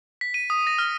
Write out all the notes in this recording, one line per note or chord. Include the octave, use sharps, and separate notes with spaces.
B6
D#7
D#6
A#6
F6